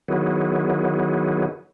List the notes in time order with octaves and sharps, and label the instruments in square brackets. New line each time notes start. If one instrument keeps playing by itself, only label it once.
[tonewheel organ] D#3 F#3 B3 E4 F#4 G#4